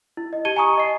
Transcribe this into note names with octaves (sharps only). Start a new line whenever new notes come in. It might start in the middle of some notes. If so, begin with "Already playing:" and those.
E4
D#5
G4 A5 G#6 C#7 D#7 G7
G#5 A#5 C#6 D#6
D#5 C7